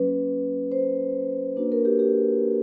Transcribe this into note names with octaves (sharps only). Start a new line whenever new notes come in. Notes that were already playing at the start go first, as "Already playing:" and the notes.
Already playing: F#3 A#3 C#4 B4
C5
A#3 D4 F#4 B4
A#4
G4
G4